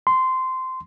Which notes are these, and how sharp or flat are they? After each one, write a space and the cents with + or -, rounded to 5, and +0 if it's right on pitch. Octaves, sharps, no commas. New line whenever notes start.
C6 -15